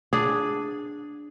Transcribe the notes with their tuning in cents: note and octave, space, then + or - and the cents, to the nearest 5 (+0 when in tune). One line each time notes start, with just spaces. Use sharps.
D4 +0 G#4 +0